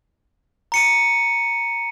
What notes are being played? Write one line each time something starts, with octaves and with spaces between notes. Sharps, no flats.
A#5 C#7 D#7